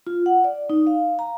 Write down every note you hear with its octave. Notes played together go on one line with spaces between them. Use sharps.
F4
F#5
D5
D#4
F5
A#5